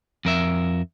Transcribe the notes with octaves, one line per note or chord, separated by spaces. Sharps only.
F2 A#4 E5